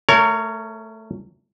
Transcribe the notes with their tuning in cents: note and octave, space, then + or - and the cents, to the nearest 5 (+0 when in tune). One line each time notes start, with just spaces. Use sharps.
A3 +0 A#4 -25 C#5 +15